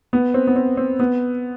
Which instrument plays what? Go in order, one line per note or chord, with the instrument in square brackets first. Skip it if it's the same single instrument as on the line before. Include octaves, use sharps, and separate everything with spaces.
[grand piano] B3
C4
B3
C4
C4
B3